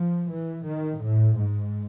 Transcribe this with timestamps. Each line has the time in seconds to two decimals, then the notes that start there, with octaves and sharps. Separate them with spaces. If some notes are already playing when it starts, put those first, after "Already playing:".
Already playing: F3
0.30 E3
0.66 D#3
1.01 A2
1.38 G#2